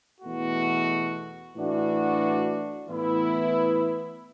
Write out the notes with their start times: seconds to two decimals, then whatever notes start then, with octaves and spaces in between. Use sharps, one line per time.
0.21 E2 B2 A3 F#4
1.55 A2 E3 D4 F#4
2.87 A2 E3 B3 E4